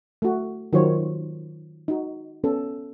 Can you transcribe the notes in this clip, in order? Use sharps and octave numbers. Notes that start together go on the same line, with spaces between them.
A3 F#4
D#3 F#3 F4 C5 C#5
D#4 F#4
B3 C#4 A4